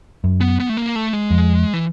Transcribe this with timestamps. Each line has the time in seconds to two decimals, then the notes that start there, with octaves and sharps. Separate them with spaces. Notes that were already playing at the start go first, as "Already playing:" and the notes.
0.24 F#2
0.41 B3
0.60 B3
0.69 A3
0.77 A#3
0.95 A3
1.13 G#3
1.31 F2
1.74 E3